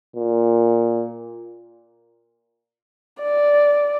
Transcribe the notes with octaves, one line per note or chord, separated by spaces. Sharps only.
A#2
D5